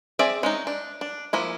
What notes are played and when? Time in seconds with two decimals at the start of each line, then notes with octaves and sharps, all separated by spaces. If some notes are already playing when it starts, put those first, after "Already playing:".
0.19 C4 G#4 D5 E5
0.43 G#3 C#4 D#4
0.67 D4
1.01 D4
1.33 F3 A#3 E4